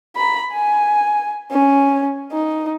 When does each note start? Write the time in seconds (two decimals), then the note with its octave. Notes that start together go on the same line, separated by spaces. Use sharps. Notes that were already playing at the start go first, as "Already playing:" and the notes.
0.16 A#5 B5
0.51 G#5
1.51 C#4
2.32 D#4